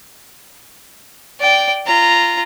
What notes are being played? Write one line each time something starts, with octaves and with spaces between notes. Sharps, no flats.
D5 G5
F4 A#5